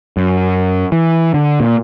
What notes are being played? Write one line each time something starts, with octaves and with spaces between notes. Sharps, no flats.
F#2
E3
D3
A#2